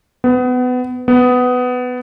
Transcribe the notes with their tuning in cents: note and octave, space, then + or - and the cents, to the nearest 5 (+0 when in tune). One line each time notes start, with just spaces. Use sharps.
B3 +25
B3 +15